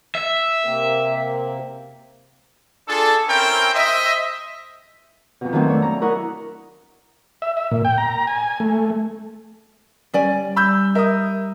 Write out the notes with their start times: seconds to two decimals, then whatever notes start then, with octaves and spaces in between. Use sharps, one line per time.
0.15 E5
0.65 C3 A#3 C4
2.88 D4 F4 G#4 A4
3.28 C4 C#4 E4 A#4 C5 G5
3.75 C5 D#5 E5
5.41 F2 B2
5.52 D#3 E3 F#3 A3 C4
5.68 A3 D4 C#5
5.82 A#5
6.01 E4 A#4 F#5 A#5 C#6 D#6
7.42 E5
7.57 E5
7.71 A#2
7.85 G5
7.98 A#5
8.27 G#5
8.60 A3
10.14 G3 C#4 D5 G#5
10.56 B5 E6 G6
10.95 A#4 E5 D#6